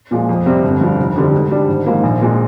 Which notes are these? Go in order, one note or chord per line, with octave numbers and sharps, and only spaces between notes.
A#2 F3 G#3
F2
C3 G3 C4
G1
G2 F3
F1
F2 D3 G3
G#2
G3 D4
G#1
G#2 F3 A#3
A#1
A#2 F3 G#3